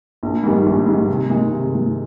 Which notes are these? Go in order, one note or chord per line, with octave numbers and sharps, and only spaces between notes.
A#1
G#2 D#3 G3
A#1
G#2 D#3 G3
C3
D#3 G#3
C3
D#3 G#3